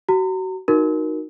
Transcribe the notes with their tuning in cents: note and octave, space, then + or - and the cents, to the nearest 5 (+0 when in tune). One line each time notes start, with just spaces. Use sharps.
F#4 +30 A#5 -30
D#4 +0 F#4 -10 A#4 +10